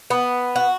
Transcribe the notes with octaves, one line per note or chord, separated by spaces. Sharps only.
B3
F#4